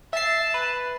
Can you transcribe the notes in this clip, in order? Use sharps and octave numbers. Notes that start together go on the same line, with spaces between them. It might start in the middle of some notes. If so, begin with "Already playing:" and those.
E5 A5 C7
B4